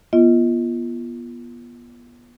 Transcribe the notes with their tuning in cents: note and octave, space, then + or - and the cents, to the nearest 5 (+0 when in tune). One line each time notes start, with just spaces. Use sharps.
B3 -30 F4 -25 D#5 +25